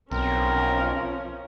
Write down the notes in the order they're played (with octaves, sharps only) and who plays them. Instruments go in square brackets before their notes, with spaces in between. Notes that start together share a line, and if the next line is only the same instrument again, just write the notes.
[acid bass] B1 [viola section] F3 C#4 [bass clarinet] C4 [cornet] A#4